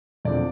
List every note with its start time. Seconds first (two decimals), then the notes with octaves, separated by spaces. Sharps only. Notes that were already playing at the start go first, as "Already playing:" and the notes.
0.25 E2 D3 F3 A3 C4 D5